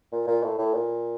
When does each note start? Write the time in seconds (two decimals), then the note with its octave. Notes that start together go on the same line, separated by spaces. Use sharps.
0.12 A#2
0.27 A#2
0.43 A2
0.58 A2
0.74 A#2